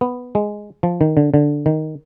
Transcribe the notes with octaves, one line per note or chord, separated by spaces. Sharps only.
B3
G#3
F3
D#3
D3
D3
D#3